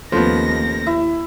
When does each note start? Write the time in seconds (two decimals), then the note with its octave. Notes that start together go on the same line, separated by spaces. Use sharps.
0.12 D#2 F3 A3 B3 C#4 A4 A#6
0.87 E4